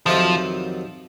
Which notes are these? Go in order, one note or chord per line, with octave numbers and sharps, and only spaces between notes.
F2 C3 D#3 F3 F#3